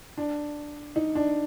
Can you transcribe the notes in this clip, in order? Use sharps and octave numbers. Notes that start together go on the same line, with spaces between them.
D4
D#4
D4